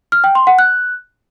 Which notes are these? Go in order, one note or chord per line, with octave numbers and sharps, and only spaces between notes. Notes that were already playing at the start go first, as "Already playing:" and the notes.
F6
G5
C6
F#5
F#6